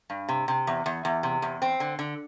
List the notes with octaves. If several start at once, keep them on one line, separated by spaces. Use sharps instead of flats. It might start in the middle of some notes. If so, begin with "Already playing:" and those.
G2
C3
C3
E2
E2
E2
C3
E2
C4
D3
D3